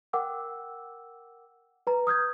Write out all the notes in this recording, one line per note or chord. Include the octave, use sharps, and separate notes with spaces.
A#4 F#5 G5 D6 E6
B4 A#5
D#6 F6 G6 G#6